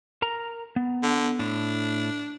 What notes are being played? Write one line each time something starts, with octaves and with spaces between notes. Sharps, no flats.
A#4 A#5
B3
D3
A2 D4